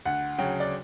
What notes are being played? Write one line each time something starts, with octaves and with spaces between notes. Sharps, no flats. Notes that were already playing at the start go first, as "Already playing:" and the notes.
D2 F#5
C#3 F#3 G5
D5